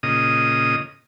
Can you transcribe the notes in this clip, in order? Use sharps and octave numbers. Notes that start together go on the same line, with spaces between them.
A#2 C#3 D#5 D#6